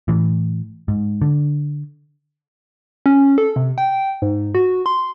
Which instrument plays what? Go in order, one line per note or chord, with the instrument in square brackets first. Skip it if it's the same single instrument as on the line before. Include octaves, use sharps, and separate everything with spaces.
[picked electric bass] A2 E3
G#2
D3
[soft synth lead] C#4
A4
C3
G5
G#2
F#4
C6